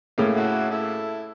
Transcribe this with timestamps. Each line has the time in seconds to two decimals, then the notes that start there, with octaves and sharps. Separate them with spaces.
0.18 A2 C#3 A#3
0.37 E4 F#4 A4
0.70 E4 A4